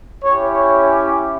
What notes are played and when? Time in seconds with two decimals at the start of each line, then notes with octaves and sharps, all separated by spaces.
0.23 C#4 E4 G4 C#5
0.57 C#5